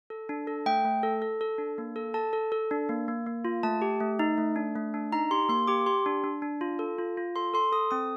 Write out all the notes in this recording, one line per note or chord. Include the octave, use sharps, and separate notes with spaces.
A4
D4
A4
A3 G5
A3
A4
A4
A4
D4
A#3
A4
A4 A5
A4
A4
D4
A#3
A#3
A#3
F4
A3 A5
G4
A3
D#4
A3
D4
A3
D4
D#4 A#5
G4 C6
A#3 C6
G4 D6
G4 C6
D4
D4
D4
F4
A4
F4
F4
A4 C6
A4 C6
A4 D#6
C4 D#6